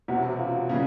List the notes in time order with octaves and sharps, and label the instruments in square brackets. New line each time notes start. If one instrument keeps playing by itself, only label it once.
[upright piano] E1 E2 C3 [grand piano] F#4 F#5
[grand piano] F4 F5
[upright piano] C#3 E3 G3 [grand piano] F4 F5